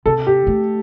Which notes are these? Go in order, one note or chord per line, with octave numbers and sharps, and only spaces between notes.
C3 A4
G4
A3